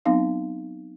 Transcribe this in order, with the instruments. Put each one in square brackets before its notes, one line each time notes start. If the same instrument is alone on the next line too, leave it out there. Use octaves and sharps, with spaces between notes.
[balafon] F#3 B3 C4 D#4 F5